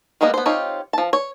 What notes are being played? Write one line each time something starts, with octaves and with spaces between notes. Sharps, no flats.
G3 G#3 A#3 B3 D#5
B3 C5
C4 D#4 F4 G4 C#5
F3 A5
C#5